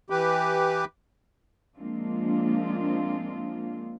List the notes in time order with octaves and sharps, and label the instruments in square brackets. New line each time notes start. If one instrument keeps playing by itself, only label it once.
[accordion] E3 G4 B4
[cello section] F3 G#3 A#3 C4 D4 F4